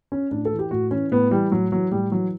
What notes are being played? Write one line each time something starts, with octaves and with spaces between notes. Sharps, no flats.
C#4
A2 D4
A4
E3
G4
A2 F#4
E3 C#4
A2 B3
E3 G3
A2 F#3
E3 F#3
A2 G3
E3 F#3